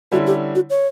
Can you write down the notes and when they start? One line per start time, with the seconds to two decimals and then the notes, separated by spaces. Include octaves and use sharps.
0.12 D3 G3 C#4 E4 F#4
0.27 G4
0.55 F#4
0.70 C#5